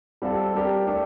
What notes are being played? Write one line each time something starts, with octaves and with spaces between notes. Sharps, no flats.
G3 C4 F4 A4
G3 D4 G4 A#4
A3 D4 A4